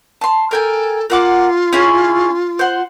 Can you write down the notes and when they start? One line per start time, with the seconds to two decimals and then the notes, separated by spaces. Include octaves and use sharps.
0.21 A5 C6
0.51 A4 A#4 G5 G#5
1.10 A#3 F4 F#5 D6
1.73 C#4 E4 G#4
2.59 C5 F#5